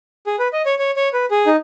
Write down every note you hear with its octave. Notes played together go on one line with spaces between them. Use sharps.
G#4
B4
D#5
C#5
C#5
C#5
B4
G#4
D#4